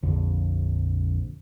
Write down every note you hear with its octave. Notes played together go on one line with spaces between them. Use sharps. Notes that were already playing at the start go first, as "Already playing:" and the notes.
A#1 F2 D3